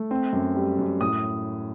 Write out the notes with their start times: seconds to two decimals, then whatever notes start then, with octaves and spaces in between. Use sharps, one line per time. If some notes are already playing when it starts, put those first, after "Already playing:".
Already playing: A3
0.11 C4
0.33 F#2
0.55 G3
0.79 F#2
1.01 A2 D#6